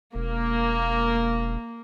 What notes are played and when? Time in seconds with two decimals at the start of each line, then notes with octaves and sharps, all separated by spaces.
0.15 E1 A#3